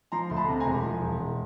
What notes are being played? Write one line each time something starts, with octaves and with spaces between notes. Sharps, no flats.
F3 A#5 C6
D2 C6
A5 B5
C3
G#5 A#5
E1
F3
E1
E1